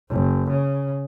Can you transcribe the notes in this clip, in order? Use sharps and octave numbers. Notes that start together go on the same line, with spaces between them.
F#1
C#3